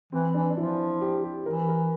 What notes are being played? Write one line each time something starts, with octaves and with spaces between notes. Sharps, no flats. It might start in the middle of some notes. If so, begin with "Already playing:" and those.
E3 C4
E3 D4
D4
F3 E4
G4
G4
E3 A#4
A#4